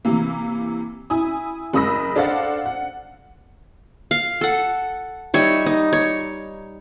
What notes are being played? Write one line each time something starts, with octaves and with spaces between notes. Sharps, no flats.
C3 E3 A#3
E4 G#5 D#6
F#1 G#3 B5 D#6 E6 A#6
D4 A4 C5 F5 F#5 A6
F#5
F5
A4 F#5
G3 D#4 C#5 E5
D#4
C#5